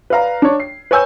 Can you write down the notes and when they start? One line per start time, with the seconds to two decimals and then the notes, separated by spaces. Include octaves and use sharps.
0.10 B4 D5 F5 A#5
0.42 D4 C#5
0.60 C7
0.91 B4 C#5 G#5 E6 G6